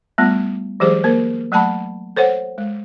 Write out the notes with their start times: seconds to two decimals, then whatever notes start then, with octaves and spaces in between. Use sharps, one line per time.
0.18 G3 A3 B3 F4
0.80 E3 F#3 G#3 G4 G#4 C5
1.04 A#3 A#4 C5
1.52 F#3 A3 F#5 A5 B5
2.16 A4 C5 C#5 F#5
2.58 G#3